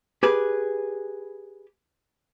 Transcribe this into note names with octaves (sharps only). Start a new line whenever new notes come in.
G4 G#4 B4